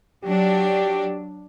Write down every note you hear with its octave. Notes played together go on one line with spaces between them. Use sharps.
F#3 D4 G4